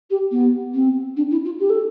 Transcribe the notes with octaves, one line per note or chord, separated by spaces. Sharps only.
G4
B3
C4
D4
E4
F4
G4
A4